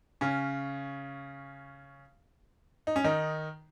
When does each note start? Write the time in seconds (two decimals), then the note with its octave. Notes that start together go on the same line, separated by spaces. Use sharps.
0.21 C#3 C#4
2.87 D#4
2.96 C#4
3.04 D#3 D#4